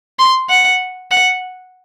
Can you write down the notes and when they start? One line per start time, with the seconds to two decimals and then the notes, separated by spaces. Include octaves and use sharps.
0.19 C6
0.50 F#5
1.11 F#5